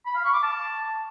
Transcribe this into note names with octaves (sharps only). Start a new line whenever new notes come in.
B5
F5
C#6
D6
A5